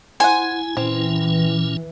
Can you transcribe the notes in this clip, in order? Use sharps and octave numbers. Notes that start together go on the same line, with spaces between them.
E4 C5 F#5 G#5
A#2 E3 C4 C#4 E4